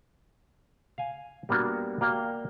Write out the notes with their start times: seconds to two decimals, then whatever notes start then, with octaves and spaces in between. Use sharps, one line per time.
0.98 F5 G#5
1.49 G3 A#3 B3 D4 F#4
2.01 A#3 F#4 D5 F5 G5